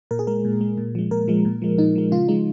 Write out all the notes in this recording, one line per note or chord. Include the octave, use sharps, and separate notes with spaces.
A#2 A#4
G#4
G#3 A#4
A#2
G#3
A#2
F3 G#3
A#2 A#4
F3 G#3
A#2
F3 G#3
A#2 D#4
F3 G#3
C#3 F4
F3 G#3 D#4